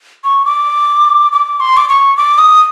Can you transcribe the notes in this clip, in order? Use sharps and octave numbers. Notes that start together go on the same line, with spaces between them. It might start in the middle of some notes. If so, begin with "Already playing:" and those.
C#6
D6
D6
C6
D6
C#6
D6
D#6